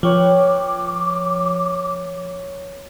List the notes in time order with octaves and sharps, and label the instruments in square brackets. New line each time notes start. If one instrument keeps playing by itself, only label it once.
[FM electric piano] F3 [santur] B4 C#5 G5 [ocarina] D6